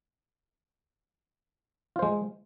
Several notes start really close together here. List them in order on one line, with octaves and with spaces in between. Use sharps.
F4 C5 G#3